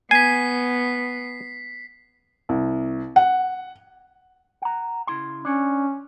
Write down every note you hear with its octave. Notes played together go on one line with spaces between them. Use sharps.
B3 G#5 B6 C7
C2
F#5
F#5 A#5
C#3 E4 C6
C#4 D4 C#5